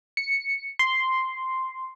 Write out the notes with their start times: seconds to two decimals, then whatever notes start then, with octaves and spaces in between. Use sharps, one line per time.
0.17 C#7
0.79 C6